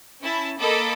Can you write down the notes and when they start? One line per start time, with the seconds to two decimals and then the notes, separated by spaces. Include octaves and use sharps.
0.22 C#4 E4 A5
0.60 A#3 A4 D#5 B5 D6